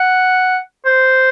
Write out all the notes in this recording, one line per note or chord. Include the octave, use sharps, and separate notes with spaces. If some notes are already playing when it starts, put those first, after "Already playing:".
Already playing: F#5
C5